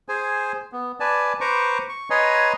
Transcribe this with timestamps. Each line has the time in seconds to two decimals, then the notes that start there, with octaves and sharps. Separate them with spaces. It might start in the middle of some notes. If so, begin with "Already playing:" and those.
0.09 G#4 C5 G#5
0.72 B3
1.00 B4 D5 G#5 A5
1.41 B4 C5 A#5 C#6 D6
1.89 C#6
2.10 B4 C#5 D#5 G#5 A#5 C6